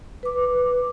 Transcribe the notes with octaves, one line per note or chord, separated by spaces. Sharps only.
B4 D6